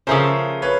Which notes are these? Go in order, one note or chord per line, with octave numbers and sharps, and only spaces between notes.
C#3 F3 A3 C#4 A#4 C5
B4 C#5